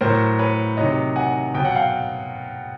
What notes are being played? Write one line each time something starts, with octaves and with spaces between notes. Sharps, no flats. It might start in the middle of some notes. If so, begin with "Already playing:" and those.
A2 F#3 A#4 C5
B4 C#5
C3 D#3 F#3 C#5 D#5
F#5 G#5
B2 F#3 G5
F#5
F5 G5